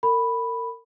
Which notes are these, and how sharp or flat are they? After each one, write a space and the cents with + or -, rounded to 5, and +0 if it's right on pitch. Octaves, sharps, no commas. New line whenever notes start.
A#4 -35 B5 +0